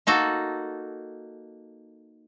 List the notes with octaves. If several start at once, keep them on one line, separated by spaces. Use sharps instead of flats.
A#3 D#4 F#4 A4